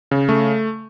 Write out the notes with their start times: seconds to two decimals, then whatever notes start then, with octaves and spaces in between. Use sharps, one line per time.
0.11 C#3
0.29 A3